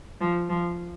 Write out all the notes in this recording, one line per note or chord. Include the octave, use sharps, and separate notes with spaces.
F3
F3